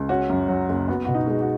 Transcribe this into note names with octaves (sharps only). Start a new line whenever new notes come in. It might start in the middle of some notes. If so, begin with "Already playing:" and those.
Already playing: C#2
C#4 F#4
F#2
F#3
F#1
B3 F#4
B2 F#4
D#4
G#3
F#4